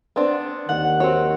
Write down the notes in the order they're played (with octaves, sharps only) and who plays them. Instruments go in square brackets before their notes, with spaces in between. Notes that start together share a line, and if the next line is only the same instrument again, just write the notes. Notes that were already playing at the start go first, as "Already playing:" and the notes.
[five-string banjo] B3 C4 D4
[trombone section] D#2 D#3 [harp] F#5
[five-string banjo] C4 F#4 [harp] C#5